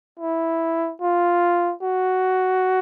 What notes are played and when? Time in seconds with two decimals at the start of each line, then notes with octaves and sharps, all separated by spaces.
0.19 E4
1.01 F4
1.82 F#4